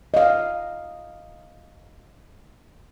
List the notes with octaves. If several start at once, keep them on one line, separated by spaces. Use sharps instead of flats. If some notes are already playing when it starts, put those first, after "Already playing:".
D#5 F5